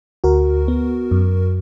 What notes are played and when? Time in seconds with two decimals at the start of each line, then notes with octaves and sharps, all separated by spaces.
0.24 D2 F#4 A#4
0.68 B3
1.11 F#2